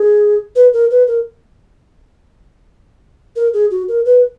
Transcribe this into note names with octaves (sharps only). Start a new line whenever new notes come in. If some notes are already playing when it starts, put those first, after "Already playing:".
Already playing: G#4
B4
A#4
B4
A#4
A#4
G#4
F#4
A#4
B4